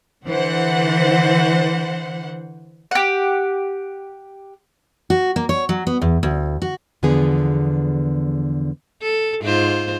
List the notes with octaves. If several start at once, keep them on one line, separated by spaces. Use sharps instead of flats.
D3 E3 C5 F#5
G4 F#5
F#4
A#3
C#5
F#3
B3
E2
D2
F#4
E2 D3 F3 B3 G#4
A4
G#2 F4 C5